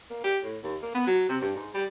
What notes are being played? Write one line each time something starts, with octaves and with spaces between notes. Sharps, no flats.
A#3
G4
A2
D#2
A#3
B3
F#3
C3
G2
G#2
G3